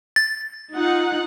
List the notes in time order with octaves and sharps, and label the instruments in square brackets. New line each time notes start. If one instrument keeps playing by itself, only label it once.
[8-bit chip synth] A6
[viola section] D#4 F4 F#5